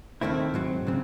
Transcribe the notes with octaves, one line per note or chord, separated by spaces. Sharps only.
D#2 D#3 A3 C4 E4
G#2 F#3 C4
C#3 F#3 C4